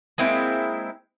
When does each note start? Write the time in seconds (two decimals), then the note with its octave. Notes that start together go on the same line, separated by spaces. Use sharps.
0.18 G#3 A#3 C4 E4